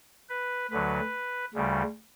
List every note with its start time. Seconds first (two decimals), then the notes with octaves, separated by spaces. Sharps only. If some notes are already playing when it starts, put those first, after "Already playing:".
0.29 B4
0.70 D2 D3 F#3 B4
1.54 D2 C#3 G3